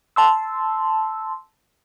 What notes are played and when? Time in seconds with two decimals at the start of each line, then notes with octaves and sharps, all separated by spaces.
0.16 A5 C6 E6